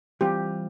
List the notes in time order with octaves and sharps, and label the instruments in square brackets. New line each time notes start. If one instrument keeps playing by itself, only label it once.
[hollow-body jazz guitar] E3 G3 C4 F4 [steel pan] G4